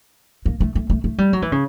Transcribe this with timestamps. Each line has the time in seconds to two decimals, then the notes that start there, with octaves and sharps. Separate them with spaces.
0.46 A#3
0.60 A3
0.75 A3
0.90 A3
1.04 A3
1.18 G3
1.33 F#3
1.42 E3
1.52 C#3